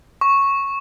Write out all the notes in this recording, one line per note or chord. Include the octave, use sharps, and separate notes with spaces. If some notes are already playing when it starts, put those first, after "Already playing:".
C#6